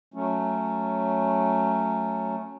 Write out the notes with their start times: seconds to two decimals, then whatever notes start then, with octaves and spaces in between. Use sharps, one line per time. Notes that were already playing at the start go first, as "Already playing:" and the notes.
0.14 F#3 A3 C#4